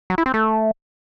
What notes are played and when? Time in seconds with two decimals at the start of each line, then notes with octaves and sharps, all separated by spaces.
0.10 F#3
0.18 E4
0.26 C4
0.34 A3